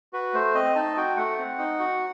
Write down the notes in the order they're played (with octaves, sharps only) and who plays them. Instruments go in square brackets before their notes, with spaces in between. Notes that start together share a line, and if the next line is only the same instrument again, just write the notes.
[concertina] F#4 B4
A3 C5
C4 D#5
D#4 A5
F#4 G5
A3 F#5
C4
D#4
F#4